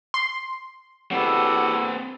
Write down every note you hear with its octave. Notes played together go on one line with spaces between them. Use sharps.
C6
E2 C4 F#4 G4 A4 B4 F#5